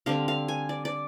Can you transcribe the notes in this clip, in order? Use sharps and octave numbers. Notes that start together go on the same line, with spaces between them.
D3 G3 C4 F5
F5
G#5
D5
D5